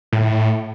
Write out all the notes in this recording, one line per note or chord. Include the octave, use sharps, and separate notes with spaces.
A2